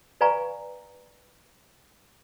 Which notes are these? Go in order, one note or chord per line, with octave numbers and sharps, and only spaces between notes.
B4 D5 F5 G#5 A#5 C#6